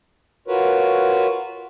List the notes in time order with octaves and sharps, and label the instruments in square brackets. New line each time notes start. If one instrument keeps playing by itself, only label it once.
[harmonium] F4 F#4 A#4 B4 C#5